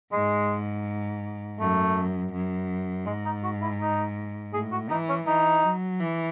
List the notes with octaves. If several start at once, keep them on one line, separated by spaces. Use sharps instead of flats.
G#2 G#3
F#2 A3
F#2
G#2 G#3
D#4
F#4
E4
D#4
A2 G#4
F#4
E3 D#4
C#4
E3 D#4
F#3
E3